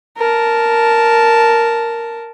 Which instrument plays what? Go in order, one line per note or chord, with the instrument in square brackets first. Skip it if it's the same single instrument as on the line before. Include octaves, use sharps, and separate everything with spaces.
[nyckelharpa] A#4 A5